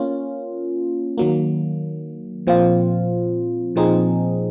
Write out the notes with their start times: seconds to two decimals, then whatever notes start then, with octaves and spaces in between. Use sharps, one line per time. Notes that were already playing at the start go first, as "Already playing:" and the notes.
Already playing: A#3 C#4 F4
1.18 D#3 F#3 A#3
2.47 A#2 F3 C4 F4
3.76 A#2 F3 C4 D#4 G#4